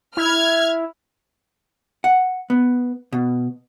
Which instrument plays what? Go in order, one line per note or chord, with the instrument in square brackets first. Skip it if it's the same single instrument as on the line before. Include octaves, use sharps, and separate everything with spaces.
[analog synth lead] E4 [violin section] F6 G#6
[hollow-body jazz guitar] F#5
B3
B2